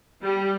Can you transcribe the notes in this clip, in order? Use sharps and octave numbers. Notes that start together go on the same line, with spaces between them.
G3